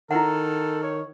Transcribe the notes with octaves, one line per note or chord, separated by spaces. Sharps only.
D#3 E4 A4 F#5
C#5